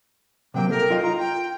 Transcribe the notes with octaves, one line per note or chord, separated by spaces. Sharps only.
C3 F#3 A#3 G5
A4 A#4
F4 D#5 G5
F4 A#5
G5